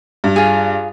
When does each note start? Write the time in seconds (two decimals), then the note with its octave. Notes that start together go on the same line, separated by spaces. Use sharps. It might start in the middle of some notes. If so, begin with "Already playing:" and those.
0.24 G2
0.36 F4 G#4